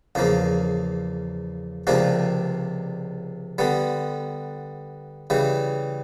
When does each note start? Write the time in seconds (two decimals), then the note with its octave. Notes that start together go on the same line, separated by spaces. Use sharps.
0.15 E2 C#3 F3 A#3
1.87 C#2 C3 F3 A#3 D4
3.58 D3 G3 B3
5.30 C#3 E3 G3